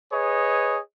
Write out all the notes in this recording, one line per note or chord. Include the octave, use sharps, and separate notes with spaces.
G#4 B4 C#5 D#5